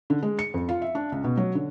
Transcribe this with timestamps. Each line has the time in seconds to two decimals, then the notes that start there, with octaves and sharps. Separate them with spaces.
0.10 D3
0.23 G#3
0.39 C#7
0.54 F2
0.69 F4
0.82 E5
0.95 D4
1.12 C#2
1.24 B2
1.37 F#3
1.55 D3